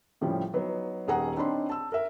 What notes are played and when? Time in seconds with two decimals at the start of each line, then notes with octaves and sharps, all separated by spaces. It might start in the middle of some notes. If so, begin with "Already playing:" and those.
0.21 A2 C#3 F3 G3
0.53 F#3 B3 D#4
1.07 D#1 D#3 G#4 F#5 A#5 D#6
1.37 C4 D4 D#4 C#5 B5 C6
1.70 A5 E6
1.92 A#4 E5